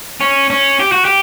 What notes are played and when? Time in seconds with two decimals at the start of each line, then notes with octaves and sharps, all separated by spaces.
0.21 C#4
0.50 C#4
0.80 G4
0.92 F#4
1.05 G4